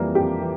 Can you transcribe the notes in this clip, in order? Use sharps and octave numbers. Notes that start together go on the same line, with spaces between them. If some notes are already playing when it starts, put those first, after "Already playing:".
Already playing: F2 E3 G3 A#3
F2 G4
E3